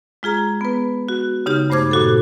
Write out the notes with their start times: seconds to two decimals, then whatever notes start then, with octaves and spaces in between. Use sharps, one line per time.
0.23 G#3 F4 G#4 A#5
0.61 B3 B4
1.09 F#4
1.46 C#3 D#4 G4 F6
1.70 G2 A3 C5 D6 G#6
1.91 A#2 F#4 A4